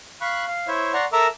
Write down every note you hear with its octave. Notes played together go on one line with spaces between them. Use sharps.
F5 B5 C#6 F#6
F5
E4 C5 C#5 E5
D5 F#5 A#5 C6 C#6
A4 A#4 E5 A#5 D6 E6